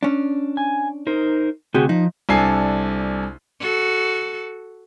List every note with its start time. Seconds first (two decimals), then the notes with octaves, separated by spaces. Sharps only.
0.03 C#4 D4
0.57 G#5
1.07 D#4 A#4 C5
1.74 D2 C3 F#4 G#4 G5
1.89 F3 D#4
2.29 C2 D4 A4 G#5 C7
3.60 F#4 A4